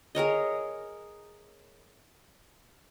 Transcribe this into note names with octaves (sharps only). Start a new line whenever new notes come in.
G#4 A#4 C#5 D#5